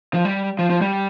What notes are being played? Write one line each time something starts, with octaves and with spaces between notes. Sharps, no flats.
F3
G3
F3
F3
G3